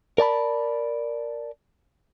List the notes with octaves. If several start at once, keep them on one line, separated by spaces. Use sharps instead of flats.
A#4 D5 A5 B5